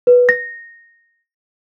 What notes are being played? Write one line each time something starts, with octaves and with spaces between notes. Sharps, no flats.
B4
A#6